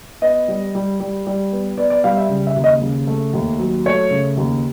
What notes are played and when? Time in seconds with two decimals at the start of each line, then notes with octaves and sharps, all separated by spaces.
0.22 B3 D#5
0.48 G3
0.75 G3
1.00 G3
1.27 G3
1.53 B3
1.77 B3 D5
1.90 D5
2.04 G3 F5
2.17 E5
2.29 C#3
2.47 E5
2.56 D#2
2.64 D#5
2.81 C#3
3.07 A3
3.34 D#2
3.59 F#3
3.86 A3 C#5
4.11 C#3
4.37 D#2